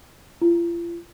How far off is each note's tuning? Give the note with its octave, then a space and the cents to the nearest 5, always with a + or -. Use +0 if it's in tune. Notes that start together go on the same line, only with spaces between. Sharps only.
F4 -40